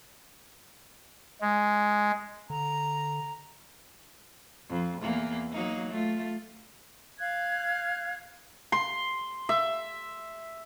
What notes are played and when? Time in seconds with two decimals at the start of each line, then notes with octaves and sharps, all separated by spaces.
1.41 G#3
2.50 D3 A#5
4.69 F2
5.02 E2 A#3
5.52 F#3 A#3 D#4
5.91 A3 F4
7.19 F5 F#6 G#6
8.72 C6
9.49 E5